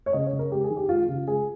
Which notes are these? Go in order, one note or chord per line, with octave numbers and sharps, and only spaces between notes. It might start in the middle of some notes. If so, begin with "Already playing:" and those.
C#5
C#3 D#5
C#5
C#3
A#4
G#3 G4
G#4
D#3
G4
G#3 F4
C#3 F4
G#3 G#4